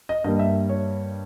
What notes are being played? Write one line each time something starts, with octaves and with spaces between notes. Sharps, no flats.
D#5
G2 G3 A#3 D#5
E5
C#5